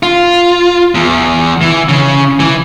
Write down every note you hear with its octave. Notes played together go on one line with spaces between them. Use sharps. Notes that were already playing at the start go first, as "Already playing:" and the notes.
F4
E2
E3
C#3
E3